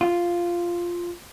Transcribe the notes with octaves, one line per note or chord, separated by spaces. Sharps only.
F4